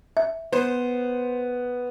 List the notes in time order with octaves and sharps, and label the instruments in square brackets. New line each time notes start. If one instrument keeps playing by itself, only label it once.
[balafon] E5
[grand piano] B3 [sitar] C5